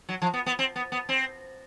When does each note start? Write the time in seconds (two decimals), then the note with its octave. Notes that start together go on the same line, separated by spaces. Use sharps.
0.09 F#3
0.22 F3
0.34 B3
0.46 B3
0.59 C4
0.76 B3
0.92 B3
1.09 C4